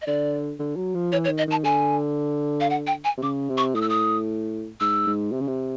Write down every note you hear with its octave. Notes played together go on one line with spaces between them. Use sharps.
D#5
D3 D5
D3
F#3
F3
E3 C#5
C#5
D#3
D#5
D#3 A5
D3 G#5
F5
F#5
G5
G#5
C3
C#3 D6
C3
C#6
A2 D#6
E6
D#6
G#2 E6
G#2
C3
C#3
C3